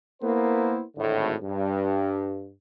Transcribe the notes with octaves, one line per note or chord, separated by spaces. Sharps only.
A#3 B3 E4 A#4 C5
G#1 A2 D3
G2